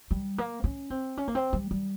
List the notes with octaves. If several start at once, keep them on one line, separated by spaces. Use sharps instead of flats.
G3
A#3
C#4
C4
C#4
A#3
C4
G3
G3